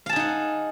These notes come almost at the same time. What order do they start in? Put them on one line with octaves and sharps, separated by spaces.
F5 A5 G#4 D#4 F#5